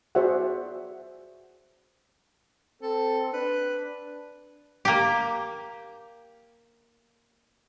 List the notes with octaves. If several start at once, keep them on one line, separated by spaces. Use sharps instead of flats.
F#4 G#4 C5 D5 E5 F#5
C4 A4
D4 B4
A#3 G4